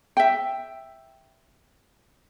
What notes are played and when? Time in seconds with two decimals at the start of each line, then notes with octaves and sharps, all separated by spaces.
0.17 E5 G5